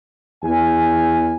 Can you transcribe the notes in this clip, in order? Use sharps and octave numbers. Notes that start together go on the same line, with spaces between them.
E2 G#5